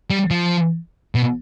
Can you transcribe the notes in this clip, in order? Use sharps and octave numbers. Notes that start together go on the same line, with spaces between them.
G3
F3
B2